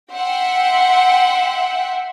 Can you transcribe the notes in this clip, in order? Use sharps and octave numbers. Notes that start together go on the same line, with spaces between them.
E5 F#5 G5 C6